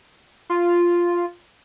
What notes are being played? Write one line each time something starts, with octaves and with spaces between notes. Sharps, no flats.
F4